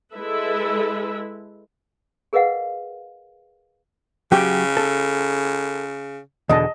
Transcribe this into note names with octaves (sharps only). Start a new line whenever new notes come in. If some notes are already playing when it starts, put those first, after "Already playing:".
G#3 E4 A4 B4 E5
G#4 A#4 B4 D#5 F5 F#5
C#3 F#3 G4 G5
A4
E2 B2 D3 D#5 A5